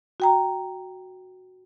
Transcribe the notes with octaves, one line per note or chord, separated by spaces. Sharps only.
F#4 G5 A#5